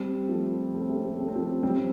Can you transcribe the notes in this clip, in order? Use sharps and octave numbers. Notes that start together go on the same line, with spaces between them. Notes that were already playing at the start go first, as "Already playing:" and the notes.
Already playing: G3 C4
F3 A3
A3
C4
A3
C4
A3
C4
A3
C4
F3 A3
G3 C4